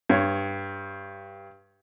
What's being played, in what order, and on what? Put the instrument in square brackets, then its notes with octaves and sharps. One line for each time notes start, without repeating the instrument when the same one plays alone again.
[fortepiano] G2 C#5